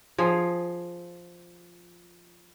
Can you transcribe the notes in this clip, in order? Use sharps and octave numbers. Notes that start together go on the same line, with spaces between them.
F3 G#4